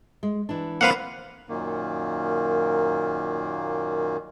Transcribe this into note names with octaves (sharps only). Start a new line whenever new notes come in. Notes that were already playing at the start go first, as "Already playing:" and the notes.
G#3
E3 D4
A#3 C4 B4 F5 F#5 B5
F#2 A#2 D#3 A#3